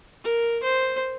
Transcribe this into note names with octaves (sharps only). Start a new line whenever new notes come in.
A#4
C5